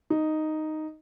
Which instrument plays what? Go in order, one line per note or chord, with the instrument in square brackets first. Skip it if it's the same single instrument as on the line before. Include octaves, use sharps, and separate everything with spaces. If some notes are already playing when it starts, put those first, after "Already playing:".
[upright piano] D#4